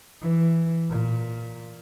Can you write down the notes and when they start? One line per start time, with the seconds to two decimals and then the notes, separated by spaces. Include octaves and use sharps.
0.22 E3
0.90 A#2